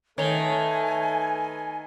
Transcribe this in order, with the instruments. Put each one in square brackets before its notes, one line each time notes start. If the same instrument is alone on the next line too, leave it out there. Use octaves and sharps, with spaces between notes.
[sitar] D#3 [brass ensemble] A3 A4 B4 [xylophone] C#5 F7 G7 [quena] G#5